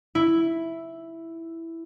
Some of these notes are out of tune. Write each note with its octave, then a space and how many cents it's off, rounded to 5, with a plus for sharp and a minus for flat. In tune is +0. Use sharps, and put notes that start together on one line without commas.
E4 +0